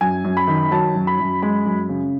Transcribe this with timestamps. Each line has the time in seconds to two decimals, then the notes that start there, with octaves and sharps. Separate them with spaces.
0.01 F#2 G#5
0.25 F#2
0.37 B5
0.48 D#3
0.71 F#3 A5
0.95 F#2
1.07 B5
1.19 F#2
1.42 G#3 B5
1.65 F#2
1.89 C#3